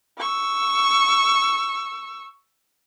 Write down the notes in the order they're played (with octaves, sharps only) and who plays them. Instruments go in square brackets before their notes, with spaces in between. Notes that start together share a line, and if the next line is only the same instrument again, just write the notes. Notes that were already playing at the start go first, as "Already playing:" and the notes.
[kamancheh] C#6 E6